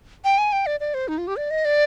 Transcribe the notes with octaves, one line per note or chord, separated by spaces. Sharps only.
G5
G#5
G5
D5
D5
C5
D#4
F4
G4
D5
D#5
D5